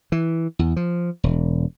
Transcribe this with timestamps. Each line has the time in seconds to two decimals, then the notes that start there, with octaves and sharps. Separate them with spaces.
0.12 E3
0.59 E2
0.76 F3
1.24 E1